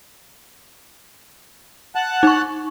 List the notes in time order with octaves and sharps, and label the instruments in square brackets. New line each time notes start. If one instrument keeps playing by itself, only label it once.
[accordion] F#5 A5 F#6
[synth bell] D#4 C#6